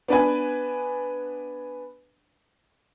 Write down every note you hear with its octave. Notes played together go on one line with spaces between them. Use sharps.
B3 D4 B4 G#5